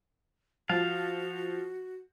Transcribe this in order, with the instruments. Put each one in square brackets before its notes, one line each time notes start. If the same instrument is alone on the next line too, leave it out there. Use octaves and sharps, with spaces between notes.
[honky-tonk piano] F3 [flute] F#4 [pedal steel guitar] F5 A5